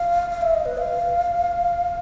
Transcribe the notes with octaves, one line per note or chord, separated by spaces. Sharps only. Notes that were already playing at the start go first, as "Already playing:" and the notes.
Already playing: F5
F5
E5
D#5
B4
F5